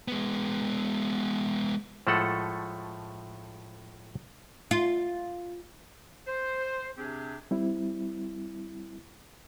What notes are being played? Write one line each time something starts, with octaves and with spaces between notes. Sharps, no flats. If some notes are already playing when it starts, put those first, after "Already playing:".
G#3 B3
A2 F3 G#3 A3 A4 F#5
F4
C5
C3 C4 D4 G4 G#4
G3 C4 E4